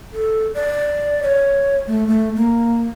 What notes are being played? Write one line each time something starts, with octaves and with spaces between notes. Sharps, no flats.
A4
D5
C#5
A3
A3
A#3